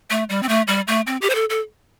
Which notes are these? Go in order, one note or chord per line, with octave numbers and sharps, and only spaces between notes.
A3
G3
C4
A3
G3
A3
C4
G4
C5
A4
A4